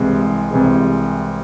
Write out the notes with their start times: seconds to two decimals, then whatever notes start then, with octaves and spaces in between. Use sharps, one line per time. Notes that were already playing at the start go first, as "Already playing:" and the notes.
Already playing: C2 C3 E3 G#3
0.51 C2 C3 E3 G#3